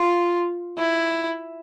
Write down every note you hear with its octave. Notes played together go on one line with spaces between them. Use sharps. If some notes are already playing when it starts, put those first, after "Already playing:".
Already playing: F4
E4